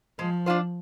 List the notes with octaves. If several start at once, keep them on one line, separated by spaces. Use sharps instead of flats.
F3 G#3
D4 F4 C5